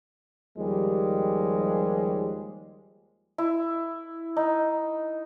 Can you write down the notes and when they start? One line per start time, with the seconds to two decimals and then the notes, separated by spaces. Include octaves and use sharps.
0.57 D#2 F3 G3 G#3
3.38 E4
4.37 D#4